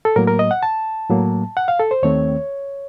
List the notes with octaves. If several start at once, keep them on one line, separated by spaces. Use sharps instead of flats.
A4
A2 F#3 A#3 A#4
A#4
D#5
F#5
A5
A2 F#3 A#3
F#5
F5
A4
C5
D#2 D#3 A3 C4 C#5